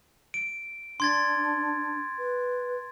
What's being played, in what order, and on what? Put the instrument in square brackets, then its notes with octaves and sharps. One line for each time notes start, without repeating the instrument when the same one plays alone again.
[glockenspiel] D7
[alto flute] D4 [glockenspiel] C6 G#6 A6
[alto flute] B4